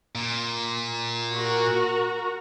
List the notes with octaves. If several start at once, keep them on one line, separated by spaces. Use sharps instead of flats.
A#2
F#4 A#4 A#5